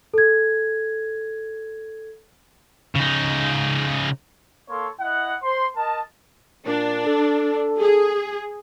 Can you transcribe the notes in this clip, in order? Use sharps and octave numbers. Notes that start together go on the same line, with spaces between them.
A4 G#6
C#3 D#4
A#3 A4 C#5 C6
E4 D#5 F#5
C5 C6
A#4 D#5 A5
A#2 D4
A4
G#4